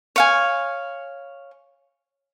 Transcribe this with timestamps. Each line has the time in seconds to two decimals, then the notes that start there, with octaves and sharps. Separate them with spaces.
0.16 C#5 F5 G#5